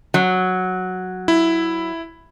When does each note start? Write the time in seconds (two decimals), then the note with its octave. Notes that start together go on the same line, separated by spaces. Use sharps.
0.14 F#3
1.28 E4